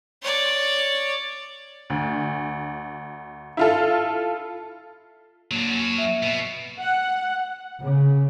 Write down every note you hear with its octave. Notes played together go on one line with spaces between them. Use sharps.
C#5 D5
D2
E4 F4 A4
F#3 A#3 D4
F#3 C#4
E5
B2
F#5
C#3